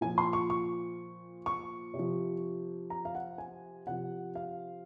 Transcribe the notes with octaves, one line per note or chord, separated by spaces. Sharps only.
A#2 F3 G#5
C6
C#6
C#6
C#6
C3
F3
A#5
F5
F#5
G#5
C3 F3 F#5
F5